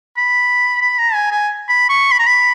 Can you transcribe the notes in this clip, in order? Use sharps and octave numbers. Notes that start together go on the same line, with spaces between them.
B5
B5
A#5
G#5
G#5
B5
C#6
B5
A#5
B5